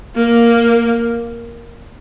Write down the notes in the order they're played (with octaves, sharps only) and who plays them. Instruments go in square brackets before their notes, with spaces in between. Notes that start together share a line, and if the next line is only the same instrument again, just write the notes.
[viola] A#3